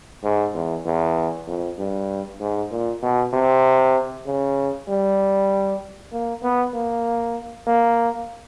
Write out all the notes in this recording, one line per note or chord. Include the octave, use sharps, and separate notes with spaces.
G#2
E2
E2
F2
G2
G#2
A#2
B2
C3
C#3
G3
A#3
B3
A#3
A#3